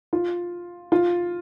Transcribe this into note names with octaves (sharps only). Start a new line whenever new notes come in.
F4
F4